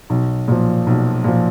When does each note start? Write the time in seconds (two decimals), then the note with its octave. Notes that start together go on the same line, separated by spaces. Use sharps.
0.10 B1
0.48 A#2 F3
0.87 B1
1.24 A#2 F3